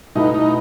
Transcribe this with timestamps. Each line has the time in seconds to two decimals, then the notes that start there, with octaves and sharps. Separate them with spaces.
0.15 B2 A3 D#4 E4 B4
0.34 D#4